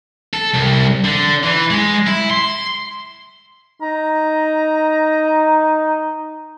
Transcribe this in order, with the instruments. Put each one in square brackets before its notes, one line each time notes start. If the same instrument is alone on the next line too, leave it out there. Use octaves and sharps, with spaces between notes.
[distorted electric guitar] A4
C2
D3
E3
G#3
E4
C6
[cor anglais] D#4 [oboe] A#5